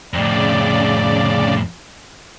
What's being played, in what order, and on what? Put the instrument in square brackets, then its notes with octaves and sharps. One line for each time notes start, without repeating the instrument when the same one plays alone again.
[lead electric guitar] F2 A2 [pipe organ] C#3 D5